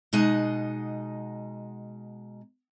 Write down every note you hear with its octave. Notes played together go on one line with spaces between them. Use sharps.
B2 G#3 D#4 D#5 F#5